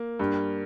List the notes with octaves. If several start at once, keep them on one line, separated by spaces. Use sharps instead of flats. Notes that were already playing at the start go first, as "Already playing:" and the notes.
Already playing: A#3
G2